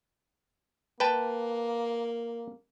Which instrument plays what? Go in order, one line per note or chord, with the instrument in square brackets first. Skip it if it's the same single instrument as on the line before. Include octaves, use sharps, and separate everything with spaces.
[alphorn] A#3 [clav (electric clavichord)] B4 G5 A5